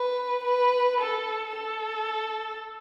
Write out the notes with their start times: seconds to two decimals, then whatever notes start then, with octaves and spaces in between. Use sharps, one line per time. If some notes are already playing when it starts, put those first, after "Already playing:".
Already playing: B4
0.44 B4
1.01 A4
1.57 A4